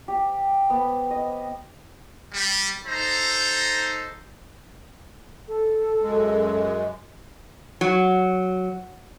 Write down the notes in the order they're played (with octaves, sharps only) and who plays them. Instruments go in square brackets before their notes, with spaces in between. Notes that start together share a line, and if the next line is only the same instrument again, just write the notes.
[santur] G4
B3
D#5
[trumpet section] G3
D#4 A4 C5 A#5
[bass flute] A4
[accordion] F#2 G#3
[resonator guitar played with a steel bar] F#3